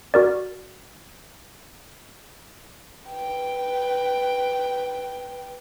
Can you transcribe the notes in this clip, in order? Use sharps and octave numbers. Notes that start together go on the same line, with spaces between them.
F#4 A#4 D5
B4 G5